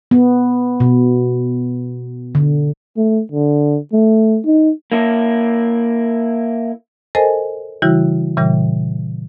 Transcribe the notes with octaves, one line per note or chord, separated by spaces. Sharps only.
B3
B2
D3
A3
D3
A3
D#4
A#3 E4
A4 A#4 C5 D#5 G#5 A5
C#3 E3 G3 E4 F#4
A#2 C#3 E3 G3